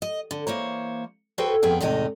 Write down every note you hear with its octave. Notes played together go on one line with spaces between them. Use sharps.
D#5
D3
E3 A#3 C5 C#5
F#4 G#4 A4 B4 C5 G5
F2 B3 G#4 G5
E2 A2 C3 G#3 D#4 D#5